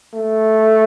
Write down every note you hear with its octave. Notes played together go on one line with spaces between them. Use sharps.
A3